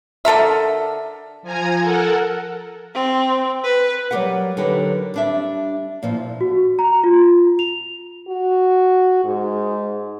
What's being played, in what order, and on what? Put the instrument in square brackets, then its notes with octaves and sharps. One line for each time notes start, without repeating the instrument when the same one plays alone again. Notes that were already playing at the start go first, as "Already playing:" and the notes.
[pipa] D3 A4 A#4 E5
[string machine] F3 G#5 A#5 G#6
A4 A#4 F#5
[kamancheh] C4
B4
[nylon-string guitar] F#3 G3 A3 G4 A#4 F#5
D3 F#3 D#4 G4 A#4 B4
G3 D4 E5
A#2 F3 E4
[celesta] F#4
A#5
F4
F7
[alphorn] F#4
G#2